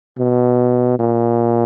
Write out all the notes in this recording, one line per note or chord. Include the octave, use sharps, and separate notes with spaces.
B2
A#2